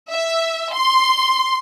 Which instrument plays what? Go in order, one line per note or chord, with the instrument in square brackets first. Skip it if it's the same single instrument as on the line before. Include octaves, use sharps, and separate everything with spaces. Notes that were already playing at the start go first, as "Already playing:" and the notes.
[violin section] E5
C6